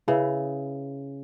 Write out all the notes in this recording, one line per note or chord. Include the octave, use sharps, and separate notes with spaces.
C#3 E4 B4 E5